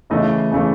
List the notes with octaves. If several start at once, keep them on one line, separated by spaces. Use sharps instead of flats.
C#3 E3 A3 D#5
C#3 E3 A3